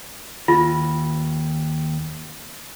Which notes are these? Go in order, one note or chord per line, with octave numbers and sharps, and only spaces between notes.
D#2 F4